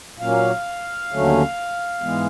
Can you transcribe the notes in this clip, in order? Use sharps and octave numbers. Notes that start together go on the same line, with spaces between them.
A#2 F#3 A#3 C#4 F5
D#2 D3 F#3 A3 C#4
G#2 E3 G#3 B3